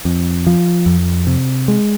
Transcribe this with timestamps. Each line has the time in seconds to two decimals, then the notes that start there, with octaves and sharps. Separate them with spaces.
0.05 F2
0.47 F3
0.86 F2
1.27 C3
1.68 G#3